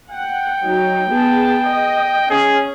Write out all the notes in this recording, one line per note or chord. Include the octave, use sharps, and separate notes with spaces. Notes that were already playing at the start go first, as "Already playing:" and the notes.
F#5 G5
F#3 D#4
B3 G#4 A5
D#5
C#4 G#4